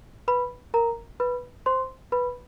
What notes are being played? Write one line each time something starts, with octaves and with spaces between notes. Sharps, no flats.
B4 B5
A#4 A#5
B4 B5
C5 C6
B4 B5